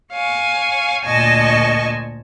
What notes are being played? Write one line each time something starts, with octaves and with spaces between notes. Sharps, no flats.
C#5 F5 G#5
D2 A#2 D#5 G#5 A5 C#6